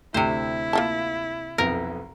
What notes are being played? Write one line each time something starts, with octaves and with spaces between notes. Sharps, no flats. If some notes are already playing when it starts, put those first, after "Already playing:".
D2 C3 E4 G4 C5
A#3 F4 A5
B1 F2 B3 A#4